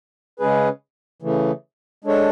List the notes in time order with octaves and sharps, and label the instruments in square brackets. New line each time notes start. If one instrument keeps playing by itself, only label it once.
[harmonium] C#3 G#3 C#4 G#4 B4
C#3 E3 A3
G#3 D4 A4 C#5